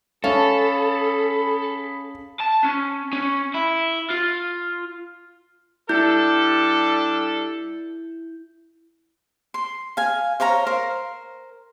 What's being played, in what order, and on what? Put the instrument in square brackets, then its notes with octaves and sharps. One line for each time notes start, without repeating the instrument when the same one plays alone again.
[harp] C#4 [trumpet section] G#4 B5 [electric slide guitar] A4 [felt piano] F5 A5
[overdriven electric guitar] A5
C#4
C#4
E4
F4
[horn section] G3 D4 A4 [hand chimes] E4 G6
[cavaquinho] C6
F5 G#5
C5 C#5 F5 A#5
A#4 C5